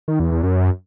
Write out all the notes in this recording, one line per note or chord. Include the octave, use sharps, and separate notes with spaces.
D#3
E2
E2
F#2